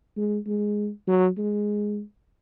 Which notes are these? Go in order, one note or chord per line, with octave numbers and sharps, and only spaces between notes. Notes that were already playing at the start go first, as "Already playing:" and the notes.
G#3
G#3
F#3
G#3